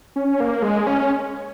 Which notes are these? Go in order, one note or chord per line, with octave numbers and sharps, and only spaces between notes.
C#4
A#3
G#3
C#4